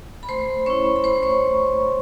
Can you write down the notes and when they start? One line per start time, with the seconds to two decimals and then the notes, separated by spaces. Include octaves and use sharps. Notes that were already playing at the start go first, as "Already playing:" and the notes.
0.23 B5
0.29 A3 C5 C6
0.66 C#4 E4 C#5 C#6
0.96 B5
1.04 A3 C5 C6
1.22 C#5 C#6